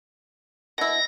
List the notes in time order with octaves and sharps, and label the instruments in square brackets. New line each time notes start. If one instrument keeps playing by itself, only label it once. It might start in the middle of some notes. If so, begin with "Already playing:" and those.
[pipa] B2 E4 [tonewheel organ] A#6